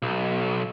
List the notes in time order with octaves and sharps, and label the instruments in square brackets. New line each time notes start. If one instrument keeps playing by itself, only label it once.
[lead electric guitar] B1